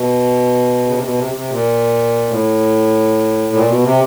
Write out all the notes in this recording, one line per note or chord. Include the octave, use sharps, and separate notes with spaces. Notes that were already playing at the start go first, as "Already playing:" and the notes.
Already playing: B2
C#3
C3
B2
C3
C3
A#2
A2
A#2
B2
C3